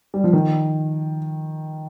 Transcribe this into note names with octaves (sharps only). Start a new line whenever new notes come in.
G3
F3
D#3